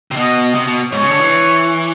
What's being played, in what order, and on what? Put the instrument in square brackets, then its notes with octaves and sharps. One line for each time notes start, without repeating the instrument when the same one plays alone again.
[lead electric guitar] C3
[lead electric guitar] B2 [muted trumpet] D#5
[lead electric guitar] C3
B2
[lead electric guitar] G#2 [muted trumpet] C#5
[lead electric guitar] C#3
D3
E3